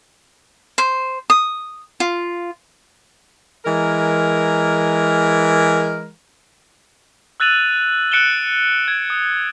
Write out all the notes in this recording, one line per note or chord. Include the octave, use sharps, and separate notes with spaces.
C5
D#6
F4
E3 G#3 A#4
E6 F#6 A6 D#7 F7 F#7
F#6 C#7 D7 E7 F#7 G7
G#6
D#6